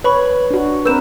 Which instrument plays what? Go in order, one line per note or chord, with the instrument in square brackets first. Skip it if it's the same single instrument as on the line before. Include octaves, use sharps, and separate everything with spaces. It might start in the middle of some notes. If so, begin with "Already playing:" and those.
[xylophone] B4 B5 C#6 [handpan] C#5
[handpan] D4 F#4
[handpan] C4 A#4 B4 [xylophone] E6 G6 E7